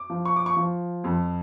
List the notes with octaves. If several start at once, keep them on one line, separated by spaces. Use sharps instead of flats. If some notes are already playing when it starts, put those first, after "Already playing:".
Already playing: D6
F3
C#6
D6
C#6
F3
F2